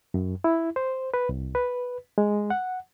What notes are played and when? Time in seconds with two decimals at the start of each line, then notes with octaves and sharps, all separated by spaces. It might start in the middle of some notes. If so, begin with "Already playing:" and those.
0.14 F#2
0.44 E4
0.76 C5
1.14 B4
1.29 C2
1.55 B4
2.18 G#3
2.50 F#5